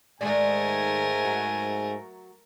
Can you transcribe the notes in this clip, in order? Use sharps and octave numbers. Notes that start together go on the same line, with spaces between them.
G#2 D#3 G#3 A3 A#4 D5 G#5
F#3